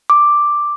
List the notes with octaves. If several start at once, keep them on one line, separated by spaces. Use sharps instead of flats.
D6